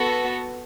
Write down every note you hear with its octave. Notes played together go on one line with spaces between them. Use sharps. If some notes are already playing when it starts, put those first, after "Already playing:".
Already playing: B3 F#4 A4